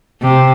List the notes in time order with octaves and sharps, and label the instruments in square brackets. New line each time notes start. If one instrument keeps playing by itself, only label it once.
[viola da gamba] C3